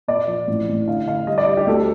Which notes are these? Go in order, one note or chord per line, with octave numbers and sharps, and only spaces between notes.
A#2 D5
F3
A1
A1
D3 F5
D3 F5
G3 D#5
D5
G3
G4
D2 A4